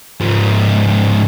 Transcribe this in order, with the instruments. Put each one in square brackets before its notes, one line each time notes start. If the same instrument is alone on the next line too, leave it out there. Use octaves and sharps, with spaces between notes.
[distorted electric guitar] G#2 F3